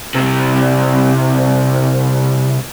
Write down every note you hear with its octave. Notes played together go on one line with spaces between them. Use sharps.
C3 G3